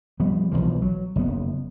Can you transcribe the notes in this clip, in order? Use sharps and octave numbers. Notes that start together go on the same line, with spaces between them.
F3 G3 B3
B1 E2 E3 F3
F#3
F#1 B2 B3